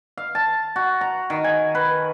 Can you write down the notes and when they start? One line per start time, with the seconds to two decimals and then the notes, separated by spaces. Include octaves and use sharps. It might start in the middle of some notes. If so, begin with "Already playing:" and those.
0.17 F5
0.35 A5
0.76 F#4
1.01 A#5
1.30 D#3
1.44 G#5
1.75 B4